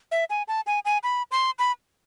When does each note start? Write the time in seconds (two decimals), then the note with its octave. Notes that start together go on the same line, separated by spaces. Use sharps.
0.12 E5
0.30 G#5
0.48 A5
0.67 G#5
0.85 G#5
1.03 B5
1.31 C6
1.59 B5